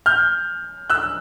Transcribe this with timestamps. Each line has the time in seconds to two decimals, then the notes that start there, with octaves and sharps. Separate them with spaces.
0.06 F6 G6
0.90 E6 F#6